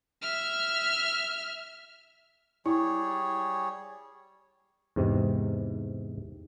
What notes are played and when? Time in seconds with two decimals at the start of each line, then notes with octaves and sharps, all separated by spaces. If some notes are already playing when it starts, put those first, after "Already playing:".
0.22 E5 F6
2.66 G3 E4 G#4 C#5
4.96 E2 G#2 C3